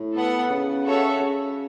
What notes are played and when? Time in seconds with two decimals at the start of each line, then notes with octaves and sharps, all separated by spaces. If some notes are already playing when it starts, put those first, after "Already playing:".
Already playing: A2
0.14 B3 A4 F#5
0.50 C#3
0.85 F#4 A4 C#5 E5
1.20 C#3